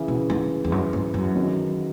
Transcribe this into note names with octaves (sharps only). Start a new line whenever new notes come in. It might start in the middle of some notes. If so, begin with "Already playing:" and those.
Already playing: C#3 E3
B2
G#2
E2
F#2
G#2
F#2
D#3 F#3